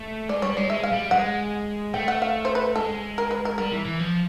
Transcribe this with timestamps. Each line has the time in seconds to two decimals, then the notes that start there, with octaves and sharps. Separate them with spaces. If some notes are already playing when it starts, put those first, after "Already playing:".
Already playing: A3
0.29 G#3 D5
0.42 G3 C#5
0.57 G#3 D5
0.70 G#3 E5
0.83 F5
0.91 G3
1.11 G#3 F#5
1.94 A3 G5
2.08 F#5
2.22 F5
2.45 C5
2.55 B4
2.76 G#3 A4
3.18 A#4
3.31 B4
3.45 A#4
3.58 G3 A#4
3.73 E3
3.86 E3
3.99 F3